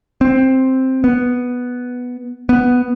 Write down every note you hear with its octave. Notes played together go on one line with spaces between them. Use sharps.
C4
B3
B3